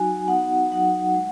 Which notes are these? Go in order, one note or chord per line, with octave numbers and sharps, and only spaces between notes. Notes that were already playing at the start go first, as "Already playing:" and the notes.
Already playing: F#3 D#4 F#4 G#5
B3 D#4 F#4 F#5
F#3 D#4 F#4 F#5
G#3